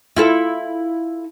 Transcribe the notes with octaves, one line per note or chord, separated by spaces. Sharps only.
E4 F4 A4